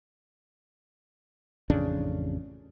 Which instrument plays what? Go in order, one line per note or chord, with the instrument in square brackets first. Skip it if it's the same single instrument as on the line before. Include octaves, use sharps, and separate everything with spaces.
[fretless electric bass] A1 F2 C#3 D4